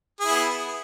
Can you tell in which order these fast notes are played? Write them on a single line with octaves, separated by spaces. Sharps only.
G#4 E4 B3